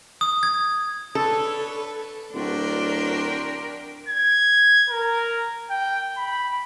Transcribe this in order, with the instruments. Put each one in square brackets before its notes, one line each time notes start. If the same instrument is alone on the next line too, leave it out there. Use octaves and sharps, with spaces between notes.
[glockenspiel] D#6
G#6
[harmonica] D4 B4 C#5 [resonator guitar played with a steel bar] A4
[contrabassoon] D1 [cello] D4 A#4 [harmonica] F#4 G5 C6
[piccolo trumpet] G#6
A#4
G5
B5